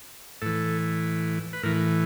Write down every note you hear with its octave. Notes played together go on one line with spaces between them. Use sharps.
A2 E3 A4
B4
A2 E3 A#4